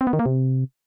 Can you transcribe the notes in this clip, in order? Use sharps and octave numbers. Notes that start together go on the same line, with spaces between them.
C4
B3
D#3
A#3
C3